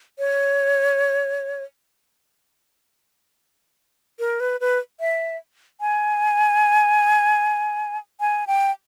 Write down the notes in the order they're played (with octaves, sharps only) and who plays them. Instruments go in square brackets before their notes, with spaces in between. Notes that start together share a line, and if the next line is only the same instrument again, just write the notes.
[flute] C#5
A#4
B4
B4
E5
G#5
G#5
G5